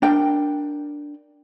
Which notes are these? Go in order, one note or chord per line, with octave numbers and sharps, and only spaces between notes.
D4 A#4 G5